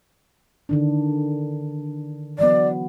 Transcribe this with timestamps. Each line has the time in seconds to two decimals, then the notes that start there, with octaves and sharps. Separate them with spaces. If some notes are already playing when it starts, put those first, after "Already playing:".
0.69 D3 D#3 D4
2.39 E3 F#3 B3 D5